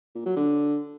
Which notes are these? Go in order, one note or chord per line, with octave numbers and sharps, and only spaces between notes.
A#2
F#3
D3